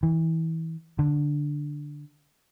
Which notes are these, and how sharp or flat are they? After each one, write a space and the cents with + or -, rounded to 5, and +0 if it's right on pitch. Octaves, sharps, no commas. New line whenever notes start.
E3 -25
D3 +0